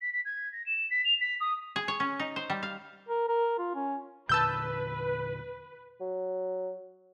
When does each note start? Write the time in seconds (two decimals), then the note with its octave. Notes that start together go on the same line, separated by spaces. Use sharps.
0.01 B6
0.12 B6
0.25 G#6
0.52 A#6
0.66 E7
0.90 B6
1.04 F7
1.20 B6
1.40 D#6
1.76 G#4
1.88 C#5
2.00 C#4
2.20 D#4
2.36 C5
2.50 G3
2.63 F5
3.08 A#4
3.28 A#4
3.59 F4
3.75 C#4
4.29 E2 A#2 D3 B4 A5 E6 G6
6.01 F#3